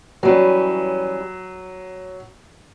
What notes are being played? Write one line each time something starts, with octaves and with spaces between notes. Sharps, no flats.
E3 F#3 G3 C#4